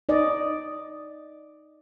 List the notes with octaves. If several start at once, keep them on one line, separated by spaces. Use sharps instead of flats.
D#4 D5 D#5